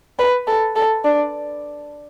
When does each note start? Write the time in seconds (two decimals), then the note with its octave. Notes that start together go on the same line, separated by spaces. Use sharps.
0.19 B4
0.47 A4
0.76 A4
1.04 D4